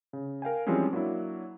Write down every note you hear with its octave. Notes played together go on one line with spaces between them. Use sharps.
C#3
A#4 F5 G5 G#5
E3 F3 G3 G#3 C4 C#4
F#3 A#3 D4 E4